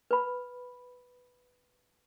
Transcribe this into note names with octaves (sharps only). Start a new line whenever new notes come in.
B4 B5